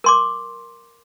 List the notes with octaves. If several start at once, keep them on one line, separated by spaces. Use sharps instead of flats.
A#4 C6 D6